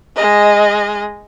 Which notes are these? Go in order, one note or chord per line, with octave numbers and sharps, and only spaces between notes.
G#3 D#5